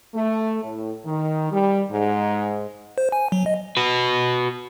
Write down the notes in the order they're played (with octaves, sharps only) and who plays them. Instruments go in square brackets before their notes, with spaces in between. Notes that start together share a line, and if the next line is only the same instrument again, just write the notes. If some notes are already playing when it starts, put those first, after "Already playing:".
[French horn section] A3
A2
D#3
G3
G#2
[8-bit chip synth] C5
G#5
F#3
D#5
[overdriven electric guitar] F#4 B4